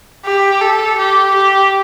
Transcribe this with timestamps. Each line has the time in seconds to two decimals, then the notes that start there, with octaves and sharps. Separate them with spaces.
0.25 G4
0.61 A4
0.98 G4
1.34 G4